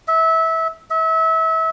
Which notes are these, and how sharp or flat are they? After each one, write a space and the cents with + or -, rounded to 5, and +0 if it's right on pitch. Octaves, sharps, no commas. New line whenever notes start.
E5 -20
E5 -30